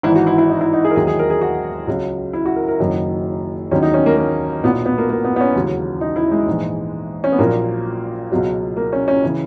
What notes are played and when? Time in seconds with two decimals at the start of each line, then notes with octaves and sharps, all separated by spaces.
0.03 G#1 G#2 E3 E4
0.16 F#4
0.27 E4
0.38 E4
0.49 D#4
0.61 E4
0.73 D#4
0.85 G#4
0.91 A#4
0.96 E1 D#2 D#3 F#3 G#4
1.07 G#4
1.19 A#4
1.30 G#4
1.41 F#4
1.87 C#2 C#3 F#3
2.33 E4
2.46 F#4
2.56 A#4
2.68 A#4
2.79 F#1 F#2 D#3 F#3
3.71 E1 D#2 D#3 F#3 C#4
3.82 D#4
3.94 C#4
4.06 A#3
4.17 A#3
4.63 B1 A#2 F#3 B3
4.86 B3
4.98 A#3
5.09 A#3
5.24 B3
5.36 B3
5.40 C#4
5.55 E1 D#2 C#3 F#3
6.01 D#4
6.16 E4
6.31 G#3
6.48 A#1 G#2 E3
7.24 C#4
7.32 B3
7.38 A#1 A#2 F#3 A#3
8.32 C#2 B2 F#3
8.76 A#3
8.93 C#4
9.08 C#4
9.24 C#3 E3